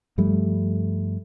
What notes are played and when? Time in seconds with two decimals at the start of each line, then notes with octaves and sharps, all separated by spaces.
0.18 G2 F3 G3 A3